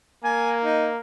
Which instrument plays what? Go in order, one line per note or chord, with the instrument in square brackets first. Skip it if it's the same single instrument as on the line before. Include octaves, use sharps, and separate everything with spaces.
[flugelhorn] A#3 [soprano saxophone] G#5
[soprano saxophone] D#4